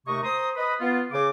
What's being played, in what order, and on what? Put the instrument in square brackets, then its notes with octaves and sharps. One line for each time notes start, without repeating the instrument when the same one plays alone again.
[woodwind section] D#2 C3 A3 D#5 C#6
C5 A#5 C6 D#6
B4 D#5 B5
B3 F4
C#3 D6